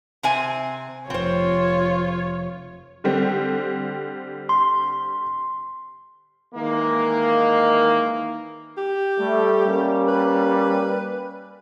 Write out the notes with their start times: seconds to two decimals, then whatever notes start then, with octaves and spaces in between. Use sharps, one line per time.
0.23 C3 C4 G#5
1.10 F1 C4 F4 C5 C#5
3.04 D3 G3 C4
4.49 C6
6.55 D#3 E3 G#3 A#3
8.78 G4
9.18 G3 A3
9.66 G3 A#3 C#4
10.08 B4